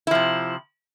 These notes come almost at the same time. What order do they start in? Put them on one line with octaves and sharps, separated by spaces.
E4 F3 C3